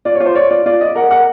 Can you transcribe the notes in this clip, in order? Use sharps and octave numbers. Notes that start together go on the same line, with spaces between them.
F4 D5
C#5
F4
C5
C#5 D5
F4 D5
F4 D5
D5 D#5
A#4 F#5
A#4 F#5